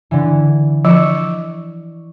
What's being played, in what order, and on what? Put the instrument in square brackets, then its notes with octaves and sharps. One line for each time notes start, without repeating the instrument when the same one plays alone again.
[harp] D3 E3
[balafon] F3 [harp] D5 C#6 E6